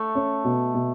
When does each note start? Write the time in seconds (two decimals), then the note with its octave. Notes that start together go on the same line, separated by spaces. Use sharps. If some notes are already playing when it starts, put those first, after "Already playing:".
Already playing: A3
0.15 C#4
0.44 B2
0.74 B2